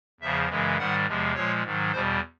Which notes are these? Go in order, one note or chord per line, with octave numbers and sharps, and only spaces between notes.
E2 C#3 F3 E5
F#2 C#3 E3 G#3
G#2 D#3 G3 F#5
E2 C3 F3 G#3
A#2 F3 G#3 C#5
G#2 D#3 F#3
E2 B2 G3 C5